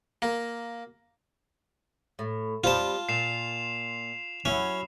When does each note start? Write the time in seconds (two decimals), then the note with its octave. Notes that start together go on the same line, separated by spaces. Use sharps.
0.22 A#3
2.19 A2
2.64 F3 G3 C4 F4 A5
3.09 A#2 C7 E7 F7
4.45 F#3 C#4 E4